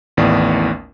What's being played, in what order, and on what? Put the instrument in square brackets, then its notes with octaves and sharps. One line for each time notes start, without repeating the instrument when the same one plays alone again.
[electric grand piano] A1 D#2 A2 B3 D5